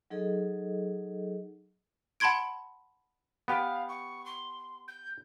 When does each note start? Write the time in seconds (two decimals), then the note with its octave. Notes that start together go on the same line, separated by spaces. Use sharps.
0.10 F#3 D#4 G#4 A4 D#5
2.20 F#5 A5 B5 C6 G#6 D7
3.48 B3 G4 F5
3.88 C#6
4.25 C6
4.88 G6